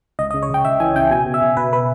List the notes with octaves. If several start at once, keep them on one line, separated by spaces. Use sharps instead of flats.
C#2 D#5
D#5
C#3
C#5
C#2 G5
C#2 E5
E3 G#5
C#3 G5
B2 G#5
B2
E5
B2
B2 B4
B4